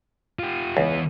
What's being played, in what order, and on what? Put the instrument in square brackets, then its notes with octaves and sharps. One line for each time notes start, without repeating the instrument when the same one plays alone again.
[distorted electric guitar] F4 G4
[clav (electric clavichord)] C#2 [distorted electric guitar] E3 B3